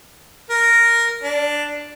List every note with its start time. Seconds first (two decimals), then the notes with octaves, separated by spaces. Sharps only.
0.50 A#4
1.23 D4